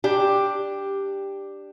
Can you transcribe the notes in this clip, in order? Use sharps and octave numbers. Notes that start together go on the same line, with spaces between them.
D4 G4